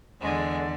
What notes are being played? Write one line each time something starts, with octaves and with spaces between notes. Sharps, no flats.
E2 D3 G#3